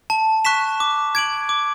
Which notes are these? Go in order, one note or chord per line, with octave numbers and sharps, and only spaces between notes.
A5
C#6 F#6 B6 E7
D6
G#6 D7 F#7
D6